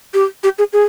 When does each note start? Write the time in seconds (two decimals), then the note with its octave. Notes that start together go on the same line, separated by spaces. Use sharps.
0.14 G4
0.43 G4
0.58 G#4
0.73 G#4